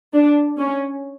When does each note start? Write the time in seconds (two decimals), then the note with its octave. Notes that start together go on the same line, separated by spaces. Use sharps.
0.14 D4
0.58 C#4